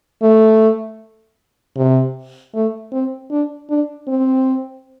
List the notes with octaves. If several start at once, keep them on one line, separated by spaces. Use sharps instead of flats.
A3
C3
A3
C4
D4
D4
C4